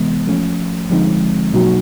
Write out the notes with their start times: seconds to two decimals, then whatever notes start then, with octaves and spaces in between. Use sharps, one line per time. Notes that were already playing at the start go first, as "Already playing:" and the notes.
Already playing: C3 E3 G#3 B3
0.27 F3 A3 C#4
0.89 D3 F3 G#3 C4 D#4
1.53 B2 F#3 A#3 D#4 F#4